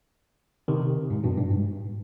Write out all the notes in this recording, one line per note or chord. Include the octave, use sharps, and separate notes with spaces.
C3 D#3
G#2
G2 B2
G2
G#2